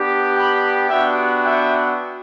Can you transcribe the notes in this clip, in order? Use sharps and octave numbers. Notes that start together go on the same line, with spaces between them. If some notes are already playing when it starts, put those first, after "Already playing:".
Already playing: B3 D4 G4
G5 B5
B3 D4 F#4 E5 G5
E5 G5